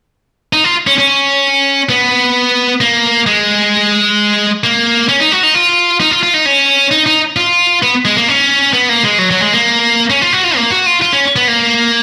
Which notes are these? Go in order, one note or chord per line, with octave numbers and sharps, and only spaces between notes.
D#4
F4
C#4
C#4
B3
A#3
G#3
A#3
C#4
D#4
F#4
D#4
F4
D#4
F4
F4
D#4
C#4
D#4
D#4
F4
B3
G#3
A#3
C#4
B3
A#3
G#3
F#3
F#3
G#3
A#3
C#4
F4
F#4
F4
A#3
F#4
F4
F4
C#4
B3
A#3